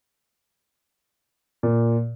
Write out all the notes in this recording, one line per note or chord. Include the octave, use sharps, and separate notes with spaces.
A#2